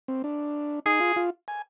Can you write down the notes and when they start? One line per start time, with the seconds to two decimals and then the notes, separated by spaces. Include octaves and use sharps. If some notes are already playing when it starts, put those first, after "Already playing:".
0.08 C4
0.24 D4
0.85 D#4 G#4
1.00 F4
1.16 F4
1.48 G#5